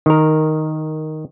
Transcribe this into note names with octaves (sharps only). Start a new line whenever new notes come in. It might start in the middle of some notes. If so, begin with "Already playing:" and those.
D#3 A#4